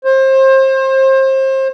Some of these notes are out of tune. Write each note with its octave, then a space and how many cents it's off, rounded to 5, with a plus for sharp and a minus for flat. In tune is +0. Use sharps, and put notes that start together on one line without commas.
C5 +30